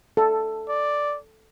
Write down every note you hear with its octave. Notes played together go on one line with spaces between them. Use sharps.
A4
D5